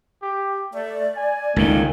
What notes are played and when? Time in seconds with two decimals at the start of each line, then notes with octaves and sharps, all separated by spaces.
0.22 G4
0.74 A3 D5
1.17 G#5
1.56 C#2 A2 D#3 A#3